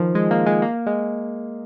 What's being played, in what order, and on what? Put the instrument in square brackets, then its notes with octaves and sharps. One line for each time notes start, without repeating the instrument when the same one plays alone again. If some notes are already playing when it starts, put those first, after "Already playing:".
Already playing: [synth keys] D#3 F3
G#3
A#3
G#3
A#3
G#3